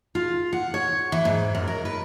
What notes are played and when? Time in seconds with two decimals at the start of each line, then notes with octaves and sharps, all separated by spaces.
0.15 F4
0.53 F#5
0.74 C#5
1.12 E3
1.25 G#2
1.55 F#2
1.68 A#4
1.85 B4